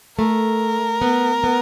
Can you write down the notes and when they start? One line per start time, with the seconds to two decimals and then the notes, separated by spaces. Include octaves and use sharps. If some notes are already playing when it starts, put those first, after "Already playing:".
0.18 A3 A#4
1.02 B3
1.44 B3